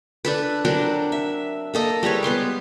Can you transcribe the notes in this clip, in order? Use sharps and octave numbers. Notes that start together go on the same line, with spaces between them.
D4 A4 B4
F#3 C4 D4 A#4
E5
A#3 A4 D#5
G3 G#3 B4 C#5
B3 B4 C6 D6